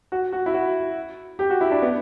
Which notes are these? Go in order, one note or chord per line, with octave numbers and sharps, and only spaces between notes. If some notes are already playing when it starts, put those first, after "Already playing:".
F#4
F#4
E4
F#4
G4
F#4
E4
D4
B3